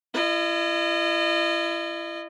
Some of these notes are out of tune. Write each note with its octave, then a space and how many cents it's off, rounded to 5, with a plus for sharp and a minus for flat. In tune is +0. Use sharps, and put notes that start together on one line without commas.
E4 +35 D#5 -30